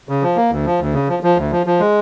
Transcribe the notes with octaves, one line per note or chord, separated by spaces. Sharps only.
C#3
F3
A#3
D2
F3
D2
C#3
F3
F3
D2
F3
F3
G#3